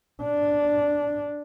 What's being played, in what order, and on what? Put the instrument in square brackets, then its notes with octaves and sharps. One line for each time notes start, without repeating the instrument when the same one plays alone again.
[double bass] D4